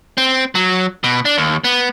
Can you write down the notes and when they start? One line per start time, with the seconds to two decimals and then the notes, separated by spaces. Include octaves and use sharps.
0.18 C4
0.55 F#3
1.04 B2
1.25 D4
1.38 D#2
1.64 B3